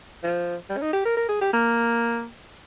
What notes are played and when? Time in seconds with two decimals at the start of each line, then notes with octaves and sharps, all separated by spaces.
0.23 F3
0.69 G3
0.77 C#4
0.82 D#4
0.93 G4
1.05 A#4
1.17 A#4
1.28 G#4
1.41 G4
1.53 A#3